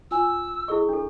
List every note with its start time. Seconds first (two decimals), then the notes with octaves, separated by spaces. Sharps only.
0.11 F4 G#5 E6
0.68 E4 G#4 A4 D#5 C#6
0.89 D4 A4